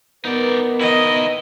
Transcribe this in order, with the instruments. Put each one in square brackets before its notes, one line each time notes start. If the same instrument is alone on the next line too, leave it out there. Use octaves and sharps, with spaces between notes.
[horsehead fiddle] B3 [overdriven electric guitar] D#4 D5 [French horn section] A#4 B4
[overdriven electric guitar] D#3 E4 [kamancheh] D#5